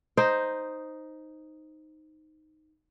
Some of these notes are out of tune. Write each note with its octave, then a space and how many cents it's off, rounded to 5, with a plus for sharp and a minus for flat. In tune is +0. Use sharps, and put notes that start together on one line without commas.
D#4 +0 C5 +0 D#5 +0